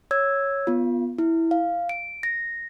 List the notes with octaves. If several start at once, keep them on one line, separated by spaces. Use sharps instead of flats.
C#5 E6 G#6
B3 F4
E4
F5
D7
A#6